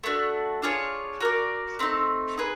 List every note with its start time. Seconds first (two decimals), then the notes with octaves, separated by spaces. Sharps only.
0.04 A3 D4 F#4
0.62 D4 F4 G#4 C#5
1.20 F#4 A#4 D5
1.79 A3 C4 D#4
2.37 D#4 G#4 B4